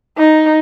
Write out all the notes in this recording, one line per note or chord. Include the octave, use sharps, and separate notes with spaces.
D#4